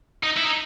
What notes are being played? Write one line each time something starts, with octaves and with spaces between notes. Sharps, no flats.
D#4
E4
D#4